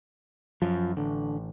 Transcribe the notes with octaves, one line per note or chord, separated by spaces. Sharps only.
F#2 F3
A1 D3